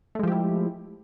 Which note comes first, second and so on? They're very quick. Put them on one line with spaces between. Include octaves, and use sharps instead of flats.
A3 G#3 F3 G4 E4